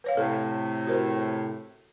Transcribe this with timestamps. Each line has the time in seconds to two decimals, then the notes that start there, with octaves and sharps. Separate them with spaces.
0.04 B4 C#5 F5
0.17 A2 C3 A4
0.87 F#4 A#4 C5